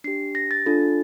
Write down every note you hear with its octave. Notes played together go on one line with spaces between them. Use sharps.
D4 G4 C7
A#6
A6
D4 F4 A4